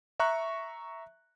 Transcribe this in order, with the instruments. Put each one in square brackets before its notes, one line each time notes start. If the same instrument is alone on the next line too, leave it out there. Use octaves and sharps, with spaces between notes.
[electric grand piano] E5 A#5 C#6 F#6